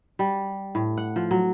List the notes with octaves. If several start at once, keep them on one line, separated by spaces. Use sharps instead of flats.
G3
A2
F#5
F3
F#3